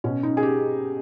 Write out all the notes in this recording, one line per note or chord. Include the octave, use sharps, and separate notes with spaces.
B2 C#4
D#4
G#4
G4